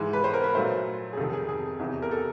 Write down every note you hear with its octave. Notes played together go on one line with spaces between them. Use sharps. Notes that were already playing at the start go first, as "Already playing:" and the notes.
Already playing: G#2 E3 G#3
B4
C5
A#4
B4
A#2 F#3 A3 C5
G#4
F2 C3 D#3 A4
G#4
G#4
E2 C3 E3
A#4
A4